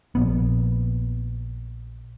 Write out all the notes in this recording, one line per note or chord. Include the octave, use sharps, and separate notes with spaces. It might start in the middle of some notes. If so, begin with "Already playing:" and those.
A#1 B3